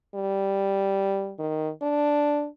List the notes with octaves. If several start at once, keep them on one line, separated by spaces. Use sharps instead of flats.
G3
D#3
D4